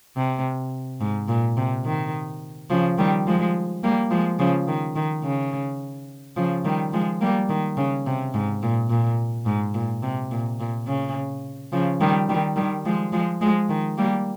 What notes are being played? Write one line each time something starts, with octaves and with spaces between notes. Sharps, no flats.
C3
G#2
A#2
C3
D#3
C#3 F3
D#3 G3
F3 G#3
G3 A#3
F3 G#3
C#3 F3
D#3
D#3
C#3
C#3 F3
D#3 G3
F3 G#3
G3 A#3
D#3
C#3
C3
G#2
A#2
A#2
G#2
A#2
C3
A#2
A#2
C#3
C#3 F3
D#3 G3
D#3 G3
D#3 G3
F3 G#3
F3 G#3
F3 G#3
D#3
G3 A#3